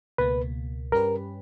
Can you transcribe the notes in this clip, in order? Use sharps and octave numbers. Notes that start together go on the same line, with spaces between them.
C#2 B2 A#3 B4
G2 G3 C#4 G4 A#4 B4